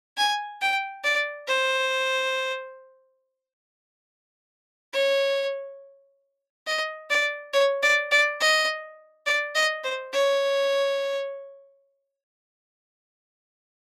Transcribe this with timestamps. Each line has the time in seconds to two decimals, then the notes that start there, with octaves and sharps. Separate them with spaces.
0.17 G#5
0.61 G5
1.04 D5
1.48 C5
4.93 C#5
6.67 D#5
7.10 D5
7.53 C#5
7.83 D5
8.11 D5
8.40 D#5
9.26 D5
9.55 D#5
9.84 C5
10.13 C#5